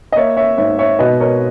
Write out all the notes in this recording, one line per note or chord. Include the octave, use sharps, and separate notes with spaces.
D#5
A#3 C#5 E5
C#5 E5
G#2 C#5 E5
C#5 E5
B2 B4 D#5
A#4 C#5